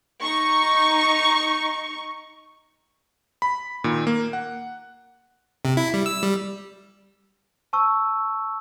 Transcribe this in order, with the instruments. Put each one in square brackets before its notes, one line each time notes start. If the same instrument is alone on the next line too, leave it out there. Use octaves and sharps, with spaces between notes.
[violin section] D#4 C#6
[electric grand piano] B5
A#2 D#3
A#3
F#5
[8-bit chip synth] C3
E4
G3
E6
G3
[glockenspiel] A5 C#6 E6